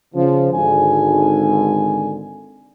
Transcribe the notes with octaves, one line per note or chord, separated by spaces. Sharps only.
C#3 F3
G#1 D3 G#5